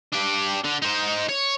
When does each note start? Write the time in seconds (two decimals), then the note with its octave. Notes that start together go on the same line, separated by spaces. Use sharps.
0.12 D4 G4
0.64 D3
0.82 D#4 C5
1.29 C#5